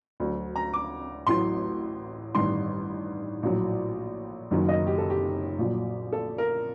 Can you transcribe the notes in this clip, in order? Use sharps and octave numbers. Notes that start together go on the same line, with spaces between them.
D2 D3 F#3
A#5
D6
A1 A2 F#3 C6
A1 G2 D#3 C6
A#1 A2 F#3
F#1 F#2 D#3 F#3
D#5
G4
A4
G4
A#1 A#2 F#3
A4
A#4